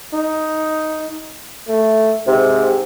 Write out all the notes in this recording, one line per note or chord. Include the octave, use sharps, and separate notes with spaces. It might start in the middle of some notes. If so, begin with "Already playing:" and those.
D#4
A3
G#2 C3